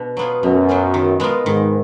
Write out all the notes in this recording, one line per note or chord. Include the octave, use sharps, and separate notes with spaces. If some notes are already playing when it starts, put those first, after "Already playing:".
Already playing: B2 D4
F#3 B3 F4 G#4
F#2 B2
F#3 B3 F4 G#4
D#3
G#3 B3 F4 A#4
G#2 D#3